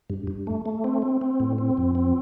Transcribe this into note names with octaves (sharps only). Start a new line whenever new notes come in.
G2
G2
A3
A3
C4
C4
C4
A2
C4
F2
C4